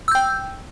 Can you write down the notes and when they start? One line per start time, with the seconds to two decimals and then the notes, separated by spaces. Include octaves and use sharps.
0.08 E6
0.11 G6
0.15 G5